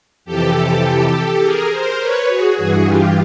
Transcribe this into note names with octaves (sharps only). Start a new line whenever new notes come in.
F2 C3 E3 G4 A4
G#4 A#4
A#4 C5
B4 C#5
F#4 G#4
G2 E3 F#4 G#4
F4 G4